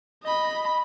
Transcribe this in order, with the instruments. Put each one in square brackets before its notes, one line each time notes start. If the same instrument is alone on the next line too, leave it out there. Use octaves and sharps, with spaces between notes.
[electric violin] D#5 B5